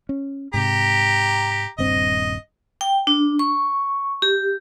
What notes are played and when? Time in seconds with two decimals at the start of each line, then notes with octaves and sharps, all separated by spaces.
0.09 C#4
0.54 G#2 C3 G4 A#5
1.78 D#1 G2 C4 D#5
2.81 G5
3.07 D4
3.39 C#6
4.22 G4